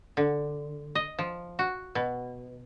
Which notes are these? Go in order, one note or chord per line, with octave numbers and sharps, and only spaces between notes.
D3
D#5
F3
F#4
B2